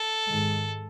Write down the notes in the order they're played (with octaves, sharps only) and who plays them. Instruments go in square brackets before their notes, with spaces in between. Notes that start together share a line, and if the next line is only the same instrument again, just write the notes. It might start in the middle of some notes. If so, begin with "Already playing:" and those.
Already playing: [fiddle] A4
[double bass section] G#2 D#3 G#3